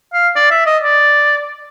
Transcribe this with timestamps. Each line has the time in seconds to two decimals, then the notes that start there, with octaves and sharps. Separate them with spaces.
0.13 F5
0.36 D5
0.51 E5
0.66 D#5
0.83 D5